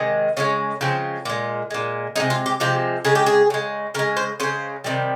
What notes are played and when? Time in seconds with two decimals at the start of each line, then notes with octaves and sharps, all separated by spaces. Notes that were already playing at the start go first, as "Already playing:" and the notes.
Already playing: C3 D#3 G#3
0.37 C#3 F3 G#3 C#4
0.81 C#3 F3 G#3 C4
1.25 A#2 G#3
1.70 A#2 G#3
2.16 C3 F3 G#3 D#4
2.30 F4
2.46 G4
2.60 C3 F3 G#3 G4
3.05 C#3 G#3 G#4
3.15 G4
3.26 G#4
3.50 C#3 G#3
3.94 C#3 A#4
3.99 G#3
4.17 C5
4.40 C#3 G#3 C5
4.84 C3 D#3 G3